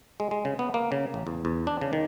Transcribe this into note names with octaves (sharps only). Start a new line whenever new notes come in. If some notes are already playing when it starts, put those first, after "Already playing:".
G#3
G#3
C#3
B3
A#3
C#3
A1
E2
E2
D4
C#3
D#3